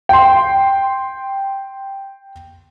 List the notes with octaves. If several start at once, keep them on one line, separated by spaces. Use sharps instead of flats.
G5 C6